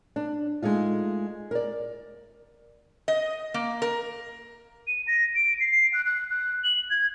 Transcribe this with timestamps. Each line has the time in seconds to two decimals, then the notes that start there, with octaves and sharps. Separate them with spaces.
0.16 D4
0.62 G#3 A3 D#4 F4
1.51 A#4 D5
3.08 D#5
3.54 A#3
3.82 A#4
4.87 D#7
5.08 A#6
5.35 D7
5.60 C7
5.93 F#6
6.05 F#6
6.30 F#6
6.64 F#7
6.90 G#6